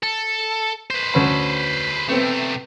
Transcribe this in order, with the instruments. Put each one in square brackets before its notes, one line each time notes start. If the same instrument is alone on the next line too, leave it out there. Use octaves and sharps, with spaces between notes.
[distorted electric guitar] A4
B4 C5
[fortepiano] D2 C#4 B5
[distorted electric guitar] C3 A3 [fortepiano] B3 C4